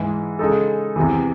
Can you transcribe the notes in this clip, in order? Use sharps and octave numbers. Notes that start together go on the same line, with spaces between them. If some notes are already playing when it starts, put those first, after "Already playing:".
Already playing: G#2 E3 G#3
C#3 G#3 D#4 A4
E2 C3 E3